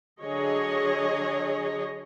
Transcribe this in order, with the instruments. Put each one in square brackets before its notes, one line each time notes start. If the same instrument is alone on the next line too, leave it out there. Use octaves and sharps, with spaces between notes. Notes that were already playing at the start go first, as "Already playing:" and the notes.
[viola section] D3 F#3 G#4 C#5 D#5